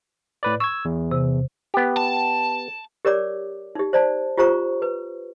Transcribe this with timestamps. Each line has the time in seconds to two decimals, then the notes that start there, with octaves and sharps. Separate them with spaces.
0.43 A2 B4 D5
0.60 C#6 E6 G#6
0.85 E2
1.11 C3
1.74 B3 G4
1.97 A5
3.05 G4 A#4 C#5 D5 D6
3.75 D#4 G4
3.93 C5 D5 A5
4.37 F4 G4 C5 A#5 C#6
4.82 B4